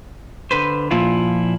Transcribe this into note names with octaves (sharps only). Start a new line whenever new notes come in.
D3 B4 C5
A#2 F3 E4 F4